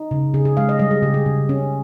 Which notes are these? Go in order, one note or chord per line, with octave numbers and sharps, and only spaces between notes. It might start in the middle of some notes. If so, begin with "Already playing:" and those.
Already playing: D#4
C#3
C#3 G#4
G#4
G#3 F5
D#5
G3 D#5
G#4
C#3 G4
G#4
C#3
C#4